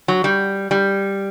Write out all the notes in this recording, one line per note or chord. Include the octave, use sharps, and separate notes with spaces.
F#3
G3
G3